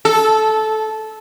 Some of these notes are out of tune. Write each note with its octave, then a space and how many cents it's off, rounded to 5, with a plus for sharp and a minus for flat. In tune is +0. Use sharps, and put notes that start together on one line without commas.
A4 -15